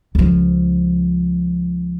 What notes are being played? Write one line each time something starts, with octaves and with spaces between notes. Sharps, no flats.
C#2 F3